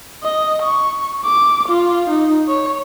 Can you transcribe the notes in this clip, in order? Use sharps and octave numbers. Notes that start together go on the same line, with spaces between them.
D#5
C#6
D6
F4
D#4
C#5